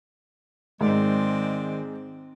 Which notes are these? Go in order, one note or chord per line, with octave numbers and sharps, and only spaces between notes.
G#2 D#3 G#3 C4 D#4 D5